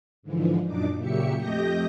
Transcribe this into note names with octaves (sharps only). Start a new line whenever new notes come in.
G#2 D3 E3 F3
F#2 A#2 D4 D#4 D6
A#2 C#3 F#3 G4 E5 C#7
F2 A3 G4 D#5 G6 A#6